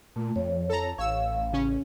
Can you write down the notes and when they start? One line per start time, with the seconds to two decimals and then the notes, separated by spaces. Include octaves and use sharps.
0.16 A#2 A3
0.36 F2 C#5
0.69 A4 A5 A#5
0.98 A1 C#5 F5 E6
1.53 C#3 C#4